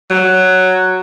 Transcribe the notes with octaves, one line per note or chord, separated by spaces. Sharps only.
F#3